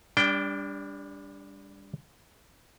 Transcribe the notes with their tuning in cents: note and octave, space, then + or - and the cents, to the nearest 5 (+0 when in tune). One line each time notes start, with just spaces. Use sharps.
G3 +25 D4 -20 G5 +0